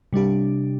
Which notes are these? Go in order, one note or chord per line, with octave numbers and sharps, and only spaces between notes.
C3 G3 D4 G4